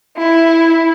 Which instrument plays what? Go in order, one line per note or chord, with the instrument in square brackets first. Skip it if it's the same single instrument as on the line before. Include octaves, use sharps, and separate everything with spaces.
[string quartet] E4